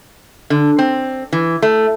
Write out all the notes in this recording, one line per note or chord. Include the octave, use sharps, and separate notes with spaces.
D3
C4
E3
A3